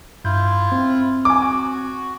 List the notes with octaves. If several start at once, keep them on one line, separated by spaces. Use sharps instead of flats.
G2 E4 F4 G6
C4
G#5 D6
F#4